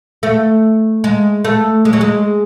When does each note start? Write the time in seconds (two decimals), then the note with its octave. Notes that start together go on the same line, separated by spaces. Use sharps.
0.23 A3
1.04 G#3
1.44 A3
1.85 G#3
1.93 F#3
2.01 G#3